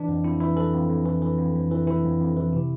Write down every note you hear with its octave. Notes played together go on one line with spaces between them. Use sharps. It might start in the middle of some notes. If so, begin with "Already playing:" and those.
Already playing: E3 D4
F2
F2 E4
E3 E4
E3 A4
F2
F2
E3
E3
F2
F2
E3
E3 E4
F2
F2
E3
C3